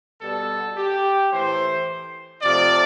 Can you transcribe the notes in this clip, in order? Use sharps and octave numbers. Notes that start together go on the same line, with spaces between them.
B2 G3 B3 A4
G4
A2 E3 A3 C5
C3 F3 A3 D5